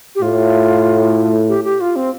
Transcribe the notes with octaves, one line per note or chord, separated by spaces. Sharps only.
G4
A2 F4
G4
G4
F4
C4